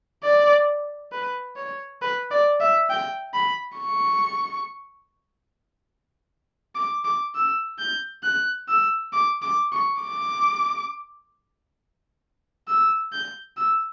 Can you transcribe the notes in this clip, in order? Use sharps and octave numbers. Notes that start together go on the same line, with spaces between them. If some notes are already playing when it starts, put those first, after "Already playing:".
D5
B4
C#5
B4
D5
E5
G5
B5
C#6
D6
D6
E6
G6
F#6
E6
D6
D6
C#6
D6
E6
G6
E6